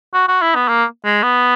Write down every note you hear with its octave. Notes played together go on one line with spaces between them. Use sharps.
F#4
F#4
E4
B3
A#3
G#3
B3